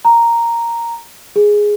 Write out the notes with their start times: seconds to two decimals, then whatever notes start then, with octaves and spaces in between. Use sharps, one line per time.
0.05 A#5
1.36 G#4